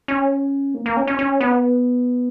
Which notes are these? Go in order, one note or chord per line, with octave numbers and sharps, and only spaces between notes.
C#4
A#3
A#3
C#4
C#4
C#4
B3